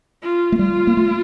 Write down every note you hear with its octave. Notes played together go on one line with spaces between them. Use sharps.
F4
A3
G3 F4
A#3
A3